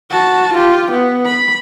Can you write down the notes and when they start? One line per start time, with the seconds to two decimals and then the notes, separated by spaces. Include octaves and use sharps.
0.10 F#4 A5
0.54 F4 G4
0.91 B3
1.26 B5